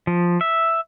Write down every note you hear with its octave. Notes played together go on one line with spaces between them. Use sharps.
F3
E5